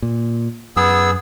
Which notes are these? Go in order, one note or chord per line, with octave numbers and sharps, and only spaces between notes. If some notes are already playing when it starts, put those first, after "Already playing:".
A#2
F#2 B3 G#4 E6